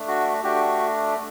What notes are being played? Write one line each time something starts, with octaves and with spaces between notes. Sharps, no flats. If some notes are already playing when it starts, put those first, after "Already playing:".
Already playing: A3 D4
F#4
A3 D4 F#4 G4